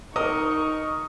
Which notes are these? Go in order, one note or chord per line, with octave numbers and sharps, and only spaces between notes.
D#4 A#4 D#5 C#6 D#6